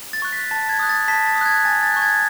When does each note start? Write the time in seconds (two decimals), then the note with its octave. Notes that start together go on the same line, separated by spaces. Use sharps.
0.13 A6
0.22 C#6 F#6
0.33 B6
0.51 A5 A6
0.69 G#6
0.79 D#6 F#6
0.89 A6
1.08 A5 B6
1.27 A6
1.35 D#6
1.41 F#6 G#6
1.65 G#5 A6
1.83 A6
1.93 C#6 F#6
2.02 G#6